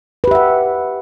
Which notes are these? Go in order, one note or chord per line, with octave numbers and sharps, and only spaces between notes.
G4 B4 E5 F#5